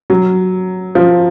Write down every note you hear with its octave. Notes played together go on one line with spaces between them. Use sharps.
F#3
F3